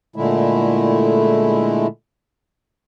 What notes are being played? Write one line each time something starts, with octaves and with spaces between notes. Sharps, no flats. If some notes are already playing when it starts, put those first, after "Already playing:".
A#2 D3 G#3 A3 E4